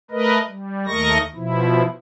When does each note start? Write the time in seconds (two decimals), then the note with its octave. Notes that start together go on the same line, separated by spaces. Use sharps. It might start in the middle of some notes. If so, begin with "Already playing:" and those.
0.11 A3 A#4 B4 D#5
0.47 G3
0.86 D#2 A3 A#4 D#5 C#6 A#6
1.35 B2 F3 E4